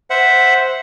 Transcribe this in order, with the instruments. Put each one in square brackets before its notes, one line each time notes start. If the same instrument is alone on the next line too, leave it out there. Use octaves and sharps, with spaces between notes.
[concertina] C5 E5 F#5